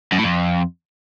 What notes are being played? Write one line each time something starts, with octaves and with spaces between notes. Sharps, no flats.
F#2
A2
F2